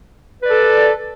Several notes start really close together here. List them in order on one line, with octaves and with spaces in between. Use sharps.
B4 D5 A4